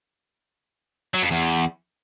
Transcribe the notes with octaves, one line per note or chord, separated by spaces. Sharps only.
F#3
F2
E2